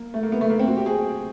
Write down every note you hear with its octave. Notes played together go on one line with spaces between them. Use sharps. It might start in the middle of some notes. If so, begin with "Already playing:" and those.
Already playing: A#3
A3
A#3
B3
A3
A#3
C4
F#4
G4
G#4